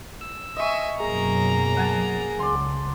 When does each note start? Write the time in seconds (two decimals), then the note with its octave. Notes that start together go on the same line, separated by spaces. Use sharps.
0.21 E6
0.56 D#5 E5 G#5 C#6
1.00 F#2 B2 F#3 A#3 G#4 A#5
1.77 F#5 G#5 A5
2.39 C#2 C#3 D5 C6